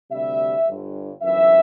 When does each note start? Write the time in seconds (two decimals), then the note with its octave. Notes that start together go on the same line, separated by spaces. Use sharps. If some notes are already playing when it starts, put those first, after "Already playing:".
0.11 D2 C3 G3 E5
0.66 G1 G2 D3
1.22 G1 F#2 E3 E5